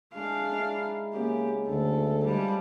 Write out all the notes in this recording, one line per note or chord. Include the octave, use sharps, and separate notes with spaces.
G#3 D4 E4 F5
D#4 E4 D5
C#3 A#3 B3 G4
D2 A4
G3 G#3 C5 F5 A5